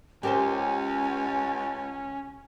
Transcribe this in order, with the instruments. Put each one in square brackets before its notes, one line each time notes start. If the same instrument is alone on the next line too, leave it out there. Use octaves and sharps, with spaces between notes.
[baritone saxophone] C#2 [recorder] C#4 [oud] G4 A#4 C5